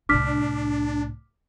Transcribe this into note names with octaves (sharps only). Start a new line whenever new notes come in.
C2 A2 D4 D6 F6 B6